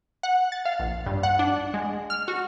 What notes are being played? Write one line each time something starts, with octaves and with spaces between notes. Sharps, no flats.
F#5
A6
F5
A#1
G2
F#5
D4
G#3
F6
F#4